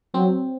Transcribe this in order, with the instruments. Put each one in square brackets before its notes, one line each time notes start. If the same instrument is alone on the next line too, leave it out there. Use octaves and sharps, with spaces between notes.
[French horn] F#3 [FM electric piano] C4